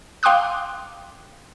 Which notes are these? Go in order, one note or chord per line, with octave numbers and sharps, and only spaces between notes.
F5 G5 C6 D6 D#6 F#6